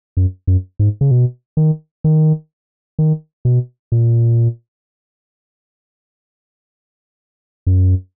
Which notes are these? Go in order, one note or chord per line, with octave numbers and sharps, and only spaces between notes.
F#2
F#2
G#2
C#3
B2
D#3
D#3
D#3
B2
A#2
F#2